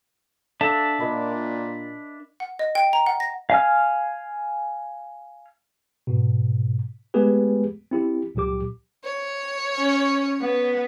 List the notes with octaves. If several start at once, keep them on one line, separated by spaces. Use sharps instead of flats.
D4 A4 E5 F5 A5 E6
A#2 A#4 D#5 B5
F#5
D#5
G5
A#5
F#5
A#6
F5 G#5 F6
G#2 B2
G#3 A3 B3 G4 G#4 B4
C4 E4 G4
C#2 A#2 F#3 G4 D6
C#5
C#4
B3